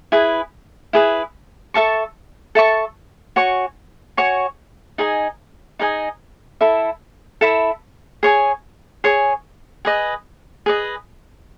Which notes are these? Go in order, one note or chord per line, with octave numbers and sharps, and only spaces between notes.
E4 G#4 B4
E4 G#4 B4
A4 E5 A5 C#6
A4 E5 A5 C#6
F#4 C#5 G#5 C#6
F#4 C#5 G#5 C#6
D#4 G#4 D#5 G#5
D#4 G#4 D#5 G#5
E4 A4 E5 B5
E4 A4 E5 B5
G#4 C#5 G#5
G#4 C#5 G#5
G#4 B4 D#5
G#4 B4 D#5